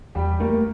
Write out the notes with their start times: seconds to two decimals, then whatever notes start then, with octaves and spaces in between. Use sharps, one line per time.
0.15 E2 G3 G4
0.40 A3 A#3 A#4